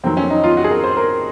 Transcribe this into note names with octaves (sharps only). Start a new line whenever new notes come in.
F2 D#3 F#3 C4
C#4
D#4
F4
F#4
G#4
A#4
C5
A#4